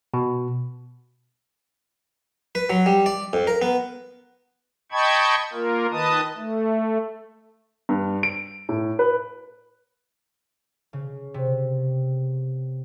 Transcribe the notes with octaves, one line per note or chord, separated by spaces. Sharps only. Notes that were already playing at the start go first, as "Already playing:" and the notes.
B2
B4
F#3
G3
D5
F2
A#4
B3
D#5 G5 A5 B5 C#6 G#6
A#3 F4 A#4
D#3 B4 D#5 A5 D#6
A3
G2
D7
A2
B4
C#3
C3